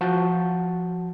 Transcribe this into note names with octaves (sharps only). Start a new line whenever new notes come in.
F3 F#4 A5 G6